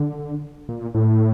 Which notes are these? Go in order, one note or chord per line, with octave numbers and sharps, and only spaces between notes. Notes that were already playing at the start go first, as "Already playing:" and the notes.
Already playing: D3
A#2
A2